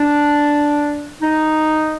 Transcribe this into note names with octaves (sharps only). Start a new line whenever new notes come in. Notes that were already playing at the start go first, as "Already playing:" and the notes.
Already playing: D4
D#4